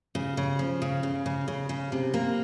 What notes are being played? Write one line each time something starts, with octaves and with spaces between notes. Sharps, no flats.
C#3
C#3
F3
C#3
C#3
C#3
C#3
C#3
C3
A#3